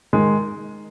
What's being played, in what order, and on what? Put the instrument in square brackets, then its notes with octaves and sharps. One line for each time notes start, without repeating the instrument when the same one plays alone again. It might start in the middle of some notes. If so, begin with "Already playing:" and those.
[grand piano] D#3 G#3